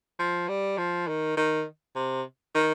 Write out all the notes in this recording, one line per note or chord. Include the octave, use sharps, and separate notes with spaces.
F3
G3
F3
D#3
D#3
C3
D#3